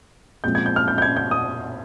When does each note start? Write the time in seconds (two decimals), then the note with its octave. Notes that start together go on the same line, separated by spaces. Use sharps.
0.44 A#2 F3 G#3 C4 G6
0.55 G#6
0.66 G6
0.76 F6
0.88 G6
0.98 G6
1.02 G#6
1.17 G6
1.31 D#6